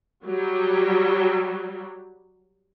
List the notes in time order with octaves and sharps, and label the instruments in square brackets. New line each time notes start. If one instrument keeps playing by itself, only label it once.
[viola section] F#3 G3